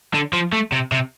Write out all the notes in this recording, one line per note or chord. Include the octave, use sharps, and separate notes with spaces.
D3
F3
A3
C3
C3